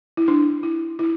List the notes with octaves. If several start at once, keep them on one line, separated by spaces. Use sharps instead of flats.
E4
D4
E4
E4